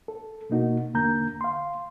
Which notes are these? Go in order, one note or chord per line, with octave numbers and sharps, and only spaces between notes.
A4
B2 A#3 D#4 F#4
E2 D3 A#3 A#5 G6
F5 C6